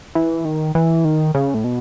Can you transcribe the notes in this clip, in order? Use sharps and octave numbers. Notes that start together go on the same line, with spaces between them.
E3
D#3
E3
D#3
C#3
A2
B2